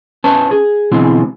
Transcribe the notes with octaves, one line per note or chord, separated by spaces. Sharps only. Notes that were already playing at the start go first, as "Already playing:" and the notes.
C#4 B4 C5 A5
G#4
B2 D3 E3 G#3 C4